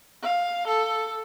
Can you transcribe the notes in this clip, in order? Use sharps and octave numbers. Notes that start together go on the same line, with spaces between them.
F5
A4